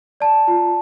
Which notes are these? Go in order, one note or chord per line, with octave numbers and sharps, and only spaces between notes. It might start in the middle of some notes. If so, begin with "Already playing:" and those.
D5 A5
F4